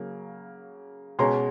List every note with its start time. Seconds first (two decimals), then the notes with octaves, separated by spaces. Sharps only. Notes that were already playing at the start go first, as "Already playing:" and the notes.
Already playing: C#3 F#3 A#3
1.19 B2 G#3 C#4 A#5 C6